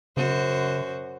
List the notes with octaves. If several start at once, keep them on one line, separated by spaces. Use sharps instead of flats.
F#2 C#3 F#4 C5